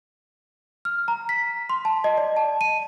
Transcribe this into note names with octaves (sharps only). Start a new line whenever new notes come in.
F6
A#5
B6
C6
A5
D#5
D5
A5
D#7